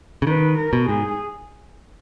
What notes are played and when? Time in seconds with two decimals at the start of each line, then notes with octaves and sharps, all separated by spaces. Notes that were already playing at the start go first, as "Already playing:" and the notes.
0.22 C#3
0.27 D#3 B4
0.57 A#4
0.73 B2
0.89 G#2 G#4